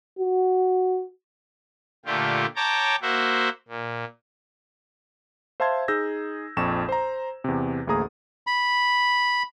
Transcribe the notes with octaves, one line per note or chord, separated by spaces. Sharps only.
F#4
A#2 D3 A3 F4 G4
C#5 G5 A5 A#5 D6
A#3 F#4 C5 E5
A#2
C5 E5 F5 A5 C6 G#6
D#4 G#4 E6 G6 A#6
A#1 F2 C#6 E7
C5 A#5
E2 C3
A1 D2 A#3 G#4 A#5 D#6
B5